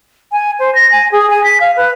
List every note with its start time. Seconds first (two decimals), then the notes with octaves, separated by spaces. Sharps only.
0.32 G#5
0.59 C5
0.74 A#6
0.91 G#5
1.12 G#4
1.30 G#5
1.43 B6
1.60 F5
1.76 B4